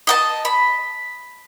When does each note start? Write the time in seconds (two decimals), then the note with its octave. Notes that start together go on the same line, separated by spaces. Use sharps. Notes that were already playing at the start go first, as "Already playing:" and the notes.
0.07 D#5 F#5 A5
0.45 B5